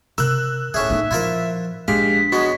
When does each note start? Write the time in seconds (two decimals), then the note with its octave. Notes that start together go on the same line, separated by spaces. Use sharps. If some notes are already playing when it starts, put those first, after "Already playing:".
0.18 C3 A#4 E6 F#6
0.74 D#1 A2 C#4 G#4 E5
0.90 A#3 D#4
1.11 A#2 F3 E4 F4 A#4
1.88 A#1 G#3 D4 G4 F5 B6
2.32 F#3 G#3 B3 F#4